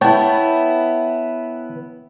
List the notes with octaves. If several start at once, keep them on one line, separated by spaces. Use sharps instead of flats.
B3 E4 C#5 G5 A5